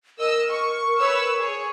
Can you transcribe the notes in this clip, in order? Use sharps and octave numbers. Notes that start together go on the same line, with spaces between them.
A#4 D#5 E6
C#6
B4 C#5 E6
G#4 C#5